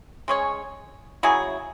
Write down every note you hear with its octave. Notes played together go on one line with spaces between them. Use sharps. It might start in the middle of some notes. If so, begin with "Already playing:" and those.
G#3 C#4 G#4 C#5
C#3 F#3 E4 G#4